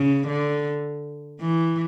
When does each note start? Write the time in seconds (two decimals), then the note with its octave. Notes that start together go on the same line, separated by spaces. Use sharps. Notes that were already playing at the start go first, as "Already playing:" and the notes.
Already playing: C#3
0.27 D3
1.41 E3